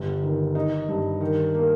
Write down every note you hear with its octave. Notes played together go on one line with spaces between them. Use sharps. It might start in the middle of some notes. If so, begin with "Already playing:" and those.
Already playing: G1
D#3
D#4
G2
D#3
A#3